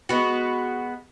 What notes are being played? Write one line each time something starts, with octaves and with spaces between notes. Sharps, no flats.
G#3 B3 F#4